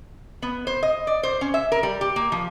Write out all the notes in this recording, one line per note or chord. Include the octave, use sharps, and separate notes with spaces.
B3
C5
D#5
D5
C5
C#4
E5
A#4
G3
G4
A#3
F3